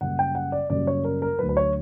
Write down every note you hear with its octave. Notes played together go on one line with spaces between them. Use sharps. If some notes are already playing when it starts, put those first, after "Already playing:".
F#2 C#3 G3 A#3 F#5
G5
F#5
D5
F#2 C#3 G3 A#3 D5
C#5
A#4
A#4
D2 D3 F#3 B4
B4
C#5